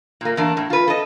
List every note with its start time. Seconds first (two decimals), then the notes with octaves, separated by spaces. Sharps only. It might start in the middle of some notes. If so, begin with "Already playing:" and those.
0.21 A#2 A#3
0.37 E2 A#3 D4
0.57 A2
0.70 F4 B4
0.88 A4 D#5